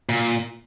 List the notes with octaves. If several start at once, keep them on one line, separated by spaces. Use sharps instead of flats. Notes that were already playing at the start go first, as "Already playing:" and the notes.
A#2